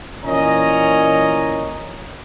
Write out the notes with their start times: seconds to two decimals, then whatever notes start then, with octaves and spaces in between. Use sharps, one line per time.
0.24 A#2 E3 C#4 C#5 D#5 A#5